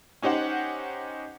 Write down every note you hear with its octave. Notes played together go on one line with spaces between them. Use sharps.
C#4 D#4 G4 C5 F#5